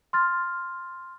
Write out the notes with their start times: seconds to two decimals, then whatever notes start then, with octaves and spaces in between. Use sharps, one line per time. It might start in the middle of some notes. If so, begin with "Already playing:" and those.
0.13 C6 F6 A6